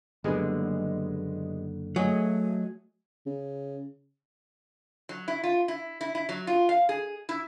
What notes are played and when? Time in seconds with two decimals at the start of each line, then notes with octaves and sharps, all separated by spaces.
0.24 F#1 D3 G3 G#3 B3
1.96 F#3 A3 G#4 D#5 G#5
3.26 C#3
5.09 F#3
5.28 E4
5.44 F4
5.68 E4
6.01 E4
6.15 E4
6.29 F#3
6.47 F4
6.69 F5
6.89 G#4
7.29 E4